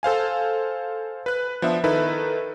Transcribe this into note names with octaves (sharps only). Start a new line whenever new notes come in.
A4 C5 F5 G#5
B4 F#6
F3 B3 D4 E5
D#3 D#4 E4 A4 B4